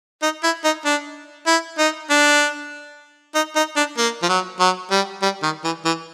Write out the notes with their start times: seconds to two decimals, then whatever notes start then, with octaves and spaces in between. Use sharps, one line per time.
0.22 D#4
0.44 E4
0.64 D#4
0.85 D4
1.47 E4
1.79 D#4
2.10 D4
3.35 D#4
3.56 D#4
3.76 D4
3.98 A#3
4.23 F3
4.29 F#3
4.60 F#3
4.91 G3
5.22 G3
5.43 D#3
5.64 E3
5.85 E3